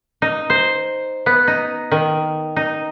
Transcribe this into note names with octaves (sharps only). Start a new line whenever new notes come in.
D#4
C5
B3
D#4
D#3
D#4